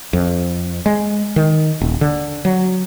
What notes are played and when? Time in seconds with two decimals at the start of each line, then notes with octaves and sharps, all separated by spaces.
0.13 F2
0.86 G#3
1.36 D#3
1.81 D#1
2.01 D3
2.45 F#3